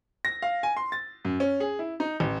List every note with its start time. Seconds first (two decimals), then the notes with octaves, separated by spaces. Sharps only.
0.25 A#6
0.42 F5
0.63 G#5
0.77 C6
0.92 A6
1.25 F#2
1.40 C#4
1.60 G#4
1.79 E4
2.00 D#4
2.20 A1